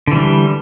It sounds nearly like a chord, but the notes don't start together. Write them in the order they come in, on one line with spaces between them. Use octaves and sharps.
D3 E3 G3